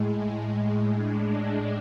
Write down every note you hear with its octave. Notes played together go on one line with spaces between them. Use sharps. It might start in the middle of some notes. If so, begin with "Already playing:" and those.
Already playing: A2 G#3
D4